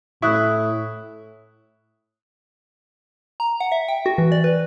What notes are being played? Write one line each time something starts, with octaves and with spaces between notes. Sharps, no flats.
A2 E4 C#6 D#6 F#6
A#5
F#5
E5
G5
F#4
E3
D5
B4